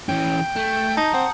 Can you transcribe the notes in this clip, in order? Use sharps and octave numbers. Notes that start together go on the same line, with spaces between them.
E3 C#4 G5
A3 G6
D#4 A5 A#5 D#6
C4 F#5